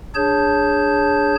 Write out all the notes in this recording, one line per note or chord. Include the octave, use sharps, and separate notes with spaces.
D4 G#4 C#5 A5 G6